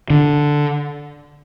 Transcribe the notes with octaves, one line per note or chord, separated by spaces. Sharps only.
D3